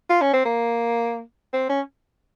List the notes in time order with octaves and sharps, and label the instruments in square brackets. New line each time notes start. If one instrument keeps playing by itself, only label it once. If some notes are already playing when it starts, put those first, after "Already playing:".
[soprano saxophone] F4
C#4
C4
A#3
C4
C#4